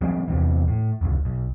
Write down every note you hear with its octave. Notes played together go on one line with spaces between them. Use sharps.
F3 G3 G#3 C4
E2 C3 E3
A2
F1 C#2
B1